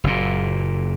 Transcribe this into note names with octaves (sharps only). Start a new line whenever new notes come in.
F#1 A#2